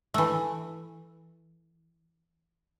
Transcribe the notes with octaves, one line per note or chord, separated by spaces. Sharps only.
E3 A3